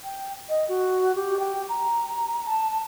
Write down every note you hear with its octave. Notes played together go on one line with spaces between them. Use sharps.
G5
D#5
F#4
G4
G5
A#5
A5